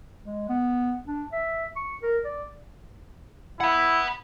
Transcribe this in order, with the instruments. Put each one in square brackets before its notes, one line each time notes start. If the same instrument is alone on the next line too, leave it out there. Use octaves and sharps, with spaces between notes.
[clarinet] G#3
B3
D4
E5
C#6
A#4
D5
[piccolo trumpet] E4 [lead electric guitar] F#5 B5